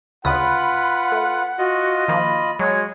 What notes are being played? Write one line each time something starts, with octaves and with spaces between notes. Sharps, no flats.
D2 C#3 F4 B4 F#5 B5 D#6
A3
F4 F#4 D#5
D#3 F3 A#3 B5
F#3 G#3 C#5